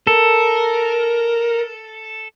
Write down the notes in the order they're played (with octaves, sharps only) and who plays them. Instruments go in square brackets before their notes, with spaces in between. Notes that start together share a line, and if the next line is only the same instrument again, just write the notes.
[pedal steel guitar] A4 [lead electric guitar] A#4